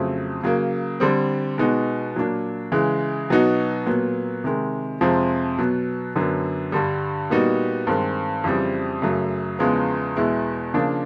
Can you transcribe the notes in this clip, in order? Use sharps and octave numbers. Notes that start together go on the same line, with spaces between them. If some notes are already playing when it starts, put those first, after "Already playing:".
Already playing: F2 C#3 F#3 A3 C4
C#3 F#3 A#3
D3 G3 C4
B2 G#3 B3 D#4 F#4
A#2 F#3 A#3 D4
C#3 E3 G#3
B2 F#3 B3 D#4 F#4
A#2 F#3 B3
C3 D#3 G#3
F2 C3 F3 G#3 C4
B2 F#3 B3
F#2 D3 F#3 B3 D4
G2 D3 G3
A#2 G3 B3 D#4 F#4
G2 D#3 G#3 C4
F2 C#3 E3 G3 C4
F#2 C#3 F#3 A3
E2 C#3 F3 G#3 B3
E2 B2 G#3 B3 E4
C#3 F3 A#3 D4